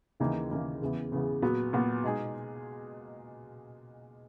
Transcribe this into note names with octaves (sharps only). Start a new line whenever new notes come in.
D#2 C#3 E3 A#3 D#4
D#2 C#3 E3 A#3 D#4
E2 C#3 E3 B3
E2 C#3 E3 B3
A#2 F#3 B3 F#4
A#2 F#3 B3 F#4
B2 G#3 D#4 G#4